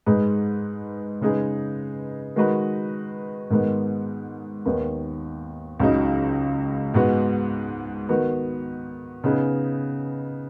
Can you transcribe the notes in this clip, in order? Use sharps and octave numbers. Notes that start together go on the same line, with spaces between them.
G#2 G#3 D#4 G#4 B4
C#3 G#3 D#4 G#4 B4
D#3 G#3 D#4 F#4 B4
G#2 D#3 G#3 B3
D#2 D#3 B3
C#2 C#3 F#3 D#4
G#2 G#3 B3 F#4
D#3 B3 F#4
C#3 B3 D#4 G#4 B4